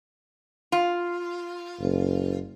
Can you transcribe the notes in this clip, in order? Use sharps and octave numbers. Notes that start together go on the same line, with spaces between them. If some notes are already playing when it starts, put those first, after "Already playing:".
F4
F#1